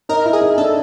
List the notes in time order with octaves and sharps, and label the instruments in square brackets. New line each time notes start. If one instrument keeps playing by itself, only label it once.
[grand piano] D#4 [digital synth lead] A#4
[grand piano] E4
[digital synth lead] G#4
[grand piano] D#4
[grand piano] D4 [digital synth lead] A4